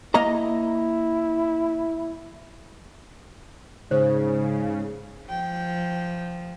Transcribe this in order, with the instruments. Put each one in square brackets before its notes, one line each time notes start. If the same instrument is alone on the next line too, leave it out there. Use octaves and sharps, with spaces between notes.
[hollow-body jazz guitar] A#3 D#5 A#5 [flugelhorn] E4
[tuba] G#2 [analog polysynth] C#3 [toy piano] C5
[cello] F3 [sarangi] G5